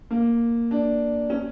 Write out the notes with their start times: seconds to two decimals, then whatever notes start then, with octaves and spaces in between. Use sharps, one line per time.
0.11 A#3
0.71 D4
1.30 C#4